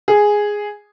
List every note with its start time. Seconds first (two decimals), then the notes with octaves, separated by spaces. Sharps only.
0.08 G#4